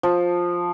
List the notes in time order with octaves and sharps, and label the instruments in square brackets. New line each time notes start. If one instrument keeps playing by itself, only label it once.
[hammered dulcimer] F3